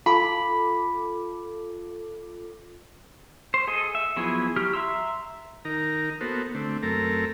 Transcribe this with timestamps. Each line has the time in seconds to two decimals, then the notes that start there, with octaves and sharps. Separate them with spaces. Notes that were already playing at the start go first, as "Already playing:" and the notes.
0.06 F4 A4 B5 D6
3.54 C5
3.67 G#4 A4 D#5
3.95 E5
4.16 F3 F#3 B3 E4 G#4
4.56 F#3 G4 F6
4.73 E5 A#5 C6 E6
5.65 D#3 D#4 A#4 A#5
6.21 A#3 B3 F#4 A4 C5
6.55 D3 A3 C4
6.83 F#2 A3 C4 A4 A#4 A#5